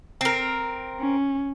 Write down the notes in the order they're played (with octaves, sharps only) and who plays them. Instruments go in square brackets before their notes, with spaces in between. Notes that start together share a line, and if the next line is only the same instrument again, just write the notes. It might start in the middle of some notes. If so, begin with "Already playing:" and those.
[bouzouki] C4 A#4
[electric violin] C#4